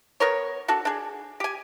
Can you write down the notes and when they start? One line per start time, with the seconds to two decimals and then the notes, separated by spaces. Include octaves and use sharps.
0.20 B3 A#4 C#5
0.68 D4 F#4 A4
0.85 D4 G#4
1.40 G4 G#5